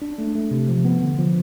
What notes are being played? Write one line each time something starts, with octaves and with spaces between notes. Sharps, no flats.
D4
A3
A3
C3
F3
B3
D3
F3